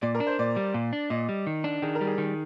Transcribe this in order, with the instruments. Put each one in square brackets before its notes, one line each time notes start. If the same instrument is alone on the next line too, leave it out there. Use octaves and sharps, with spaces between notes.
[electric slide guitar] A#2 [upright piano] D5
[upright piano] A#4
[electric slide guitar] D4
[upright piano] C5
[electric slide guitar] A#2 [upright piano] D5
[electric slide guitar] G3
A#2
D4
[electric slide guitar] A#2 [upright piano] D#5
[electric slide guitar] G3
D#3
D4
[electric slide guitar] D#3 [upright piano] G#4
[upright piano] A#4
[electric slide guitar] G3
[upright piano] G#4
[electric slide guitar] D#3